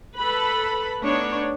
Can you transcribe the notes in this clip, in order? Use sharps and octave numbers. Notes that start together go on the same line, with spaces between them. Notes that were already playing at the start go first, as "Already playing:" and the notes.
A4 B4 B5
A3 B3 D4 D#4 C#5